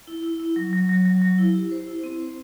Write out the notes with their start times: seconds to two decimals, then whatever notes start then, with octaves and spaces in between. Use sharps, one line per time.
0.07 E4
0.24 E4
0.40 E4
0.56 F#3
0.73 F#3
0.89 F#3
1.05 F#3
1.22 F#3
1.38 E4
1.55 G4
1.71 C5
1.87 E4
2.04 C4
2.20 C5